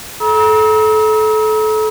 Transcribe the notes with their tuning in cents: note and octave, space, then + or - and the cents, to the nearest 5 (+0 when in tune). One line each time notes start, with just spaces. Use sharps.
A4 -25 A#5 +40 E6 -45